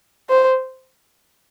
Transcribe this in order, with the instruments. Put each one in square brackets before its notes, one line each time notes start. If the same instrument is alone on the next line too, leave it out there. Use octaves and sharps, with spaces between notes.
[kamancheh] C5